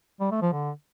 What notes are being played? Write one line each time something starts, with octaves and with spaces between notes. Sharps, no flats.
G3
A3
F3
D3